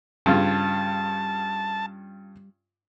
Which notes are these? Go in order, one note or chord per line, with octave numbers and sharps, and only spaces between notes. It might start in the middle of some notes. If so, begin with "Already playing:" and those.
G2 C#3 G3 F4 A5